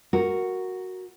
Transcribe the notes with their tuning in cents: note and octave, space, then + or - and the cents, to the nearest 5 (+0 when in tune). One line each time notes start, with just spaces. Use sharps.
F#4 +0 A#4 +0